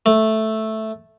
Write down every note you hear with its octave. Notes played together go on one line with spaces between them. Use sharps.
A3